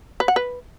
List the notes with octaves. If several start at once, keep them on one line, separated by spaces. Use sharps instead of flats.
B4
F#5
B4